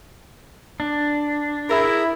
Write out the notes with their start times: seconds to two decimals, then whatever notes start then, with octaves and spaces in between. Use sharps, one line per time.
0.80 D4
1.70 E4 G#4 A#4